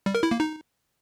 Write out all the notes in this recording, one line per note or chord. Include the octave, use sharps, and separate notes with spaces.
G3
A#4
E4
A#3
D#4